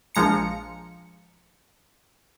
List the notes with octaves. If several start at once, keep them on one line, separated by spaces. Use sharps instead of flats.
A#1 F3 G#3 A#5 C#7